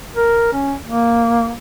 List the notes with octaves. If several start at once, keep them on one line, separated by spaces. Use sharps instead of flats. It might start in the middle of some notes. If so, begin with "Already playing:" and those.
A#4
C#4
A#3